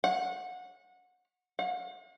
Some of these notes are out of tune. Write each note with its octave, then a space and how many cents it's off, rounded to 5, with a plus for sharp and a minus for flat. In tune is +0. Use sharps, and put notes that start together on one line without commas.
F#5 -25
F#5 -45